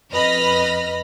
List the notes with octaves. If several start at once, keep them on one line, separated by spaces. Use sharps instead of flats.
F2 B4 D#5 B5 F6 A#6